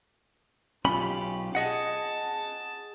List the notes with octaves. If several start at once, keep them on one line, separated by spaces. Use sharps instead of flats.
B1 C#4 F4 G4 B5
G#4 D#5 F#5 A5